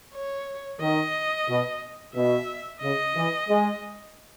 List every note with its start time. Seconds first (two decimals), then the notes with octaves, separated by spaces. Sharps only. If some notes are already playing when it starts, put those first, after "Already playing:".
0.13 C#5
0.80 D#3 D#5
1.48 B2
2.14 B2 E5
2.81 C#3 D#5
3.15 E3
3.48 G#3